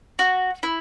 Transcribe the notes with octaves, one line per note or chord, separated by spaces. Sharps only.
F#4
E4